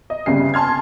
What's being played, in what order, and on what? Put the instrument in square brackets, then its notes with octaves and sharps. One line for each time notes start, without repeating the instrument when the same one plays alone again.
[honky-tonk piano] D#5
G1 C2 C#3 G3 C7
G#5 A5 C6 F6 G#6